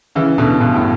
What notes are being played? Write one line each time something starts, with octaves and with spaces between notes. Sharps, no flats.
C#3 E3
B2 D3
G2 B2
A2